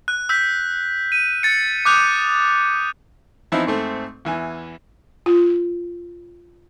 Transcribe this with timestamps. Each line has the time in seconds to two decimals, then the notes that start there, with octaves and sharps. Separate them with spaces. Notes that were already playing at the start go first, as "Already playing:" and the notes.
0.08 F#6
0.29 E6 G6 B6
1.12 D#7
1.43 A6 C#7
1.85 D6 D#6 F#6 G6 F7
3.52 E3 F3 B3 C4 D#4 E4
3.67 G#2 A3 C4
4.25 E2 E3 G#5
5.26 F4